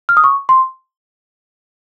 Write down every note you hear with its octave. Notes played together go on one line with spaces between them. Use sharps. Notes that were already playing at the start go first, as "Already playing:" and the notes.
F6
D#6
C#6
C6